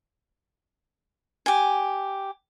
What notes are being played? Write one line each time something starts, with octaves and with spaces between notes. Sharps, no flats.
G4 G#5